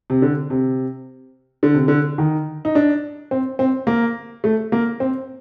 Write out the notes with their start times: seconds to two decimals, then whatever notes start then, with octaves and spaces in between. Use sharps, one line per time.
0.10 C3
0.22 D3
0.50 C3
1.63 D3
1.74 C3
1.88 D3
2.18 D#3
2.65 D#4
2.75 D4
3.31 C4
3.59 C4
3.87 A#3
4.44 A3
4.72 A#3
5.00 C4